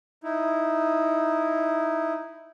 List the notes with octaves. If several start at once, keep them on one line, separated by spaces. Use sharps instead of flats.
D#4 E4